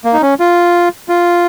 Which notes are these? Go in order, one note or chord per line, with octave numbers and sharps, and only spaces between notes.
A#3
D#4
C#4
F4
F4